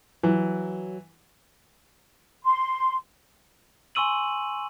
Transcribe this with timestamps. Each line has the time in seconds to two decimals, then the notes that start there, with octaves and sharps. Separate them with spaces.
0.23 E3 F#3
2.45 C6
3.95 G#5 C6 C#6 E6 D#7 F#7